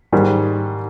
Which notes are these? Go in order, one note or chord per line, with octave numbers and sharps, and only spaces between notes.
G#2 D#3 G3